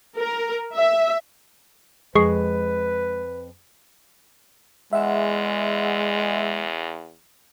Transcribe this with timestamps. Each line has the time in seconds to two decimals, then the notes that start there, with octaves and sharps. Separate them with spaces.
0.17 A#4
0.75 E5
2.15 F2 G#3 G#4 B4 C#6 C7
4.93 E2 G#3 E5 F#5 E6